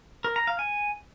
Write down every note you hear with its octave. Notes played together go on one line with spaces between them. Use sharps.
A#4
A#5
F5
G#5